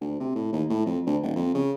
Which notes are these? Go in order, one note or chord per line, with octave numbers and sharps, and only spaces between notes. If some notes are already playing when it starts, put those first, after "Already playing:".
D2
C3
A2
D#2
A2
F2
D2
D#1
F2
C#3